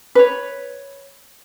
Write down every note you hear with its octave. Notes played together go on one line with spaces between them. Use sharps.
B4 C#5